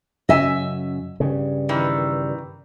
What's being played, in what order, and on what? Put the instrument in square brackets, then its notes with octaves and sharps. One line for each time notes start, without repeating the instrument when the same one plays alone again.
[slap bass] F#2 C#3 F#3 [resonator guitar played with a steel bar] D#5 E5 G#5
[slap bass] G2 C#3
[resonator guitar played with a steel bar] D#3 E3